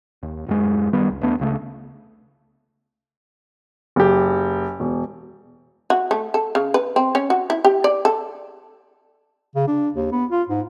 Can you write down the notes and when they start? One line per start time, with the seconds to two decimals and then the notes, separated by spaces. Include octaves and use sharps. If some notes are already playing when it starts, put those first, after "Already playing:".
0.23 D#2
0.47 D#1 F#2 G#3
0.93 D#3 G3 B3
1.10 C#2
1.23 E2 A3 B3 D4
1.39 C#2 C#3 A3
3.96 F#1 G4
4.80 E1
5.90 F#4
6.11 A3
6.34 A4
6.55 C#3
6.74 B4
6.96 C4
7.15 C#4
7.30 F#4
7.50 E4
7.64 G4
7.84 D5
8.05 A4
9.56 C#3
9.68 D4
9.94 D#2
10.12 B3
10.31 F4
10.49 G#2